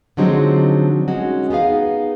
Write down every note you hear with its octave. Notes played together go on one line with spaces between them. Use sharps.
D3 F3 F#3 G#3 C4 D#4
G#3 C#4 D#4 F#4
B3 D#4 G#4 F5